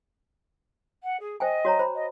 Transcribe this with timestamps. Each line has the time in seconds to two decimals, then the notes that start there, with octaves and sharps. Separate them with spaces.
1.03 F#5
1.19 G#4
1.40 C5 D#5 G5 G#5
1.65 F#4 C#5 A#5
1.79 C5 B5
1.94 D#5